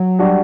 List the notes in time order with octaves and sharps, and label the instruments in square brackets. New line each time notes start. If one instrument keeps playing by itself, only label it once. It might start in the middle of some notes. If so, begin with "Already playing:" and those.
Already playing: [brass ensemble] F#3
[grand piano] G3 D4 F#4